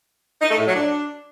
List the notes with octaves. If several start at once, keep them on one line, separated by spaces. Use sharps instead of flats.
D#4
A3
A2
F#3
D4